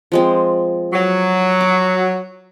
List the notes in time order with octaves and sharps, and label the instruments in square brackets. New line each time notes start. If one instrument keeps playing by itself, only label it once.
[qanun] F3 G#3 C4
[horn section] F#3
[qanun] D6